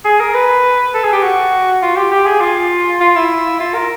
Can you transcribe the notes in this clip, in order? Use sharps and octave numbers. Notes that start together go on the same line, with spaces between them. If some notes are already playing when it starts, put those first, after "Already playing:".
G#4
A#4
B4
A4
G#4
G4
F#4
F4
G4
G4
G#4
F4
F4
E4
F4
A#4